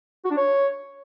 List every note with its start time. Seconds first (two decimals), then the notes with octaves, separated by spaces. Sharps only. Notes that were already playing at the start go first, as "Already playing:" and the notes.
0.25 F#4
0.31 D4
0.37 C#5